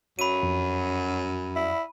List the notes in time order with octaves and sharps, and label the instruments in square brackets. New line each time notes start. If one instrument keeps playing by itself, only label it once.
[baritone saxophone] F#2 [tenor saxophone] F#3 [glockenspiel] B5 D#7
[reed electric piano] F2
[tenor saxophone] E4